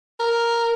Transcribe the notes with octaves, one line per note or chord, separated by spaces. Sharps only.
A#4